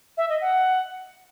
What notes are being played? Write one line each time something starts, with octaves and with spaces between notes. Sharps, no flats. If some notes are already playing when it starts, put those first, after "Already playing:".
E5
D#5
F#5